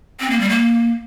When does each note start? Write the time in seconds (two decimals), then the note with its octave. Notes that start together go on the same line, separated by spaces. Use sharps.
0.20 C4
0.30 A#3
0.40 G3
0.50 A#3